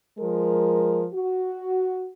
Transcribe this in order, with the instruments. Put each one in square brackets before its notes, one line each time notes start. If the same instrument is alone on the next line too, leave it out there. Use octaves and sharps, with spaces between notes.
[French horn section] F3 G#3 A#4
F#4